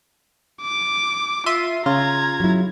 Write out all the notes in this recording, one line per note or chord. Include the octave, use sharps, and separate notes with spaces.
D6
F4 E5 C6 D#7
C#3 F4 A#5 G#6
F#3 E4